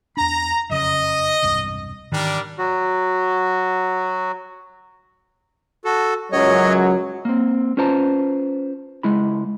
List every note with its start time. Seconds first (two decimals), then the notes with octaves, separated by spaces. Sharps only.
0.17 E2 D4 A#5
0.69 F#1 F2 C#3 D#5
1.42 E1 C2 G2
2.12 G#2 D#3 E3 G3 D4 A#4
2.58 F#3 F#4
5.85 F#4 A4
6.32 C#2 F#2 F#3 C#5 D#5
7.25 A#3 C4
7.77 C#4 F4 B4 C5 A5 A#5
9.03 C#2 G#3 E4 B5